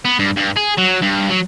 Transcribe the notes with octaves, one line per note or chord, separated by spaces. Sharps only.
B3
G2
G2
G#4
F#3
G2
F#3